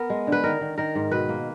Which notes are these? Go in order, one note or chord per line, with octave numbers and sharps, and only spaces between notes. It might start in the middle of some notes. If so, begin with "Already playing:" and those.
Already playing: B3 A#4
G#3
D3
B4
D#3 A#4
D#3
D#3 A#4
G#2
B2 B4
A#3